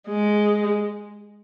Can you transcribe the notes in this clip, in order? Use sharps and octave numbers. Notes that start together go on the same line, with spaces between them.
G#3